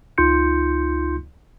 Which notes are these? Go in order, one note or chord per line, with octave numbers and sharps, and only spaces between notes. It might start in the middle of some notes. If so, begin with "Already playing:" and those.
C#2 D#4 F4 C6 G6 C#7